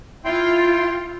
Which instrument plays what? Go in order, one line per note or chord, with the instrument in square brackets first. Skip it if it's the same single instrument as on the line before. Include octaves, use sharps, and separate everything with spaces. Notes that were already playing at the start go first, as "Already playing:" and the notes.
[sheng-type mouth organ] E4 G5 C6 [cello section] F4